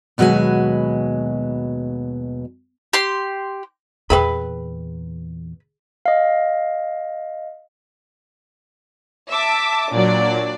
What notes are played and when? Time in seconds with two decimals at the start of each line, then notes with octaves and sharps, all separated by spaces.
0.18 D#2 B2 F#3 G#3 B4 G#5
2.93 G4 C6
4.10 E2 A#2 G#4 B4 E5 G5 B5
6.06 D#5 F5
9.30 E5 A5 D6
9.91 A#2 F#3 D4 D5